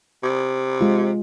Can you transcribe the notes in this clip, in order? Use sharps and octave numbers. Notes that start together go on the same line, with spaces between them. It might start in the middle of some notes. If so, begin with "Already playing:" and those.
C3
G#3 F4